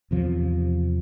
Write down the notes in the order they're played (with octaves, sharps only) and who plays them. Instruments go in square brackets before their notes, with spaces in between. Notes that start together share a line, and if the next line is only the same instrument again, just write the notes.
[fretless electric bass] E2 C3 F3